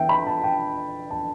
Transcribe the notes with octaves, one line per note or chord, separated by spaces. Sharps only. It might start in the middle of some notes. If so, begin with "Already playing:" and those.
Already playing: E3 B3 D4 E5 G5
B5
A5
G5
A5